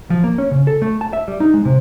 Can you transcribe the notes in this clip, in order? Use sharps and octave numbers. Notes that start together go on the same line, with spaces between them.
F3
A#3
C#4
C#3
A4
A3
A5
E5
G3
D#4
G#3
C3